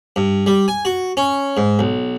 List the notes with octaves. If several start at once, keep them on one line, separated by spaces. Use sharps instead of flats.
G2
G3
G#5
F#4
C#4
G#2
B1